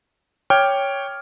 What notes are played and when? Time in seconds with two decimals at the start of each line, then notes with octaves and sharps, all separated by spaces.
0.50 C#5 G5 D6 F6 G#6